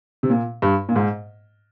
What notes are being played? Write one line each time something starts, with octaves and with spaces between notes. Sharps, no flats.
C3
A#2
G2
A#2
G#2